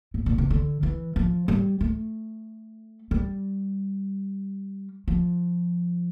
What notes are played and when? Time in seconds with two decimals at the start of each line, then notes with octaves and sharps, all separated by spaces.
0.14 A2
0.26 A#2
0.38 C3
0.50 D3
0.83 E3
1.16 F3
1.48 G3
1.81 A3
3.11 G3
5.08 F3